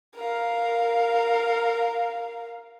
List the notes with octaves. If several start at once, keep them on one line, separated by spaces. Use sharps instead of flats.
A#4 F5